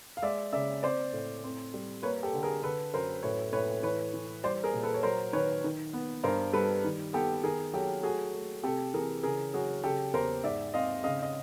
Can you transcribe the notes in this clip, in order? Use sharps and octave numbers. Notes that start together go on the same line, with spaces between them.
F5
G#3 D5 E5
C#3 D5 E5
C4 C5 D5
A2
C4
G3
A#3 B4 C#5
G4 A4
D3
G#4 A#4
D3 A4 B4
F#2 A#4 C5
A2 B4 C#5
A2 B4 C#5
E3 B4 C#5
E3
G3 C5 D5
G#4 A#4
A#2
A4 B4
C#5
F#3 A#4 C5
D#3 B4 C#5
D#3
B3
G2 A#4 C5
G3 A4 B4
D#3
B3 G4 A4
D#3 G#4 A#4
F#3 G4 A4
A3 F#4 G#4
A3
C3 G4 A4
E3 G#4 A#4
C#3 G#4 A#4
F#3 F#4 G#4
C#3 G4 A4
E2 A#4 C5
G#2 D5 E5
C4 D#5 F5
C#3 D#5 F5
D#5